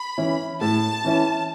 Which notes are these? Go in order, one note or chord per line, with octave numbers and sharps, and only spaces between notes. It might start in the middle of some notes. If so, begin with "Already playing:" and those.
Already playing: B5
E3 C#4 E4
A2 A5
E3 C#4 E4